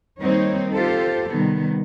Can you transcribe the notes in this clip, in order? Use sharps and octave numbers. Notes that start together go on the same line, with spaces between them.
D#3 G3 A#3 C4 D#4 C#5
F4 G4 A4 C5
C3 D#3 G3 B3